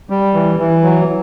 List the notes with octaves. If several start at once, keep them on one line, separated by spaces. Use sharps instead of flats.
G3
E3
E3
F#3